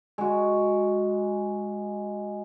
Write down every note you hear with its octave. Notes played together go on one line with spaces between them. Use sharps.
G#3 F#4